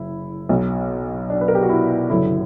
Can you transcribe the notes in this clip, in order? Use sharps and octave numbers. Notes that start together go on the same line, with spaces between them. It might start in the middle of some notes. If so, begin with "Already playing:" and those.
Already playing: F#1 E4
B1 B2
D4
B4
A#4
G4
F#4
E4
F#1 F#2 D3 E4